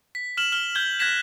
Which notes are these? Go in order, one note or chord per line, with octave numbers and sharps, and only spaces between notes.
B6
F6 E7 F#7
F6 G7
F6 G6 G#6 G7
F#6 G#6 A#6 B6 E7